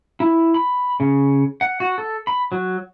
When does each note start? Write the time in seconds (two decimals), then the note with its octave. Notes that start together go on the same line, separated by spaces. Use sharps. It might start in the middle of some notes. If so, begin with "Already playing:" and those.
0.20 E4
0.54 B5
1.00 C#3
1.61 F#5
1.80 F#4
1.98 A4
2.27 B5
2.52 F#3